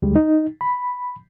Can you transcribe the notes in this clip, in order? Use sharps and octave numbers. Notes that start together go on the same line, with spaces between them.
D2 G3 G#3
D#4
B5